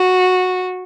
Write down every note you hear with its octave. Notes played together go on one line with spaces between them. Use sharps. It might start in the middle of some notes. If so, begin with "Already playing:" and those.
Already playing: F#4